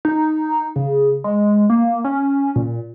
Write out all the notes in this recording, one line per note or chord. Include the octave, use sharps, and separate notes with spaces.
D#4
C#3
G#3
A#3
C#4
A#2